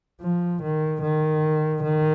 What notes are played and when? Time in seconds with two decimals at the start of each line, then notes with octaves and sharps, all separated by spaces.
0.21 F3
0.62 D#3
1.02 D#3
1.83 D#3